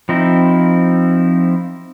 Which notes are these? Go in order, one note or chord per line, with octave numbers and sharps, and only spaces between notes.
F3 C4 D#4 E4